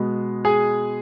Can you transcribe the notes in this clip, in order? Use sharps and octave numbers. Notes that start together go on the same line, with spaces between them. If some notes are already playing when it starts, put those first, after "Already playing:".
Already playing: B2 G#3 B3
G#4 G#5